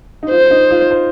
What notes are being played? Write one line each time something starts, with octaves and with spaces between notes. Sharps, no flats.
D#4
F4 C5
D#4
F4
C5